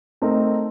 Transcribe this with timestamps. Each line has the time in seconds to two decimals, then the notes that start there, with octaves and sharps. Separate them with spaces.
0.22 A3 C4 D#4 A#4